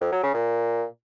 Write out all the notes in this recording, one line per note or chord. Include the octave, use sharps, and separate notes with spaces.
F2
F#3
C#3
A#2